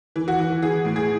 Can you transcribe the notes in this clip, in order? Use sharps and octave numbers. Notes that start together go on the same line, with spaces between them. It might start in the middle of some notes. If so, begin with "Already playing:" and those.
E3
F#4
E3
E3 G#4
A2
G#4